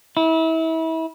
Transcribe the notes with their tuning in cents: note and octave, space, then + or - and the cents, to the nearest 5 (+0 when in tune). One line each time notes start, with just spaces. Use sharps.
E4 -30